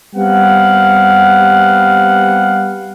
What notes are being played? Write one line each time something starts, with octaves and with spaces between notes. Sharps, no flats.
G3 B3 C4 F5 F#5